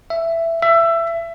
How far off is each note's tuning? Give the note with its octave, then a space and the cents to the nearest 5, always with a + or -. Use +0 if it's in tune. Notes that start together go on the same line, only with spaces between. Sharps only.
E5 +10
E5 +20